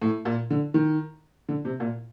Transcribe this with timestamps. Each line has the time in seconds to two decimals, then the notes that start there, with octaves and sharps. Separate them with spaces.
0.02 A2
0.25 A#2
0.50 D3
0.74 D#3
1.49 D3
1.65 C3
1.80 A#2